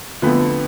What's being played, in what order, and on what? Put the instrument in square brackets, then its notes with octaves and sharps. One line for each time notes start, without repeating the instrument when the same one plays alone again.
[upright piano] F2 D3 F3 A3 [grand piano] B3